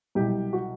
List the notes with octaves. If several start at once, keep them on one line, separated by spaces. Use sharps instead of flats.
C2 B2 F#3 G4
F#4